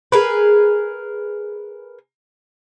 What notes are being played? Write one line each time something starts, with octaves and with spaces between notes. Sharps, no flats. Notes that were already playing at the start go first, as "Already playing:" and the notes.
G#4 A#4 B4